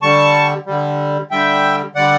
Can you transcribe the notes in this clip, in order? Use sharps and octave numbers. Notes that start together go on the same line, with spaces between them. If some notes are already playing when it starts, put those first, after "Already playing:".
D3 G3 A5 C#6
D3 G3
D3 G3 E5 G5
D3 G3 D5 F#5